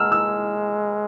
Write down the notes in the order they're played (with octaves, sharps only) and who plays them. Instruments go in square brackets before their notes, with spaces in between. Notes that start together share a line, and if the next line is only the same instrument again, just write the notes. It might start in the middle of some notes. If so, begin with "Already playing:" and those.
Already playing: [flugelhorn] G#3 [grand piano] E6 F6
[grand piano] E6